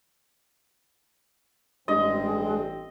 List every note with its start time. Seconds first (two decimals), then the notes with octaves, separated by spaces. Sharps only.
1.88 A1 G2 G#3 C4 D#5